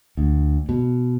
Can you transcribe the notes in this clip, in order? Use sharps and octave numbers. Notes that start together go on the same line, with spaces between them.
D2
B2